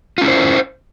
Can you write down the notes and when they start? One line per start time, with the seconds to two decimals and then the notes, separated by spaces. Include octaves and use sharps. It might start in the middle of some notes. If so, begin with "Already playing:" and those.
0.18 F4
0.21 C#4
0.25 E4
0.28 C5